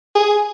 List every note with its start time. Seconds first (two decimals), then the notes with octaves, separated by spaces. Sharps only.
0.15 G#4